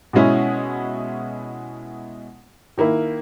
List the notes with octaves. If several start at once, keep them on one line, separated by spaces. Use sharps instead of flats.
B2 G#3 C#4 E4
D#3 A#3 E4